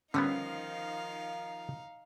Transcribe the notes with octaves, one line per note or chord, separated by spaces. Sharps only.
D3 D#3 F3 G3 B3 C#4 D#4 F5